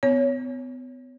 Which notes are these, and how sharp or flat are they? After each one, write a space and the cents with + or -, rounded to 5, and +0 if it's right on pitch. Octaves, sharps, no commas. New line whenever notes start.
B3 +40 C#5 +10